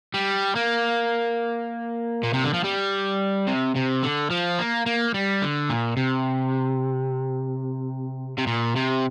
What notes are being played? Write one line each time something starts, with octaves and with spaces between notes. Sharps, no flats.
G3
A#3
A#2
C3
D3
F3
G3
C3
C3
D3
F3
A#3
A#3
G3
D3
A#2
C3
C3
A#2
C3